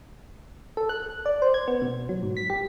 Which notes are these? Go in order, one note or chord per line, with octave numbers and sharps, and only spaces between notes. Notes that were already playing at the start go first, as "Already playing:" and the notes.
A4
F#6
D5
C5
G#6
B3
B2
F#3
G#2
B6
G4